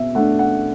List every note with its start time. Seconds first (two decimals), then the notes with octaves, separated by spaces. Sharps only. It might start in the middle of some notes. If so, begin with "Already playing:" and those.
Already playing: B2 E5
0.15 A3 D4 F#5
0.39 F#5